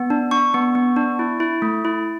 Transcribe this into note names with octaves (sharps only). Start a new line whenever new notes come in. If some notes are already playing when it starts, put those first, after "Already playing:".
Already playing: B3
D4
D4 C#6
B3
B3
D4
E4
E4
A3
E4